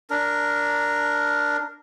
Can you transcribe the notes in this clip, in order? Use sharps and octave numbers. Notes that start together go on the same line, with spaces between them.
D4 A#4